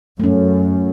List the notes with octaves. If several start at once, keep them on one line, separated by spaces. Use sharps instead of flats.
F#2 A3 C#4